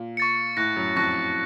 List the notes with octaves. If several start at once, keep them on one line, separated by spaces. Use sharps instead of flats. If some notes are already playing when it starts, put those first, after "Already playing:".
Already playing: A#2
C#6 A6 C#7
A2 C#6 F#6 A#6
F#2
F2 C#6 F#6 A#6